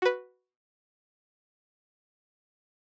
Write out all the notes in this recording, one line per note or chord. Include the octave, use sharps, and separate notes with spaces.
F#4 B4